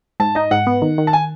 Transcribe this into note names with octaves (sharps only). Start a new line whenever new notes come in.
G#2 A5
D#4 D#5
G#2 F#5
B3
D#3
D#3
A5
G#5